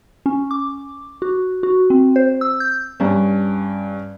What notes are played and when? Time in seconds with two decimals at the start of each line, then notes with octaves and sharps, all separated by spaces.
0.26 C#4
0.51 D6
1.22 F#4
1.63 F#4
1.90 C4
2.16 C5
2.41 E6
2.60 G6
3.00 G2 C#4